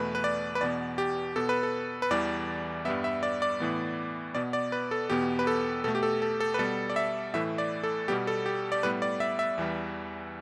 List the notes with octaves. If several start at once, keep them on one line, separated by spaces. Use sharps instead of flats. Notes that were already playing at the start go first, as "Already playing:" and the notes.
Already playing: E2 B2 A3 B4
B4
D5
B4
E2 B2 B3 D5
G4
B2 B3 A4
B4
A4
B4
E2 E3 G3 D5
G2 G3 B3 E5
E5
D5
D5
A2 E3 B3
B2 B3 D5
D5
B4
A4
E2 B2 B3 G4
B4
A4
B2 A3 A4
G4
A4
A4
A4
B4
B2 G3 B3 A4
D5
E5
A2 E3 A3 E5
D5
A4
B2 G3 B3 G4
A4
G4
D5
A2 G3 B3 B4
D5
E5
E5
E2 E3 G3